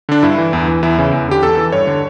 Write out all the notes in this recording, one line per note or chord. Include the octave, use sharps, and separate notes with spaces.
D3 D4
G2 E4
E3
E2
E3
E2 E4
C#3 E3
E2
D3 G4
E2 A4
E3
G2 C#5
D3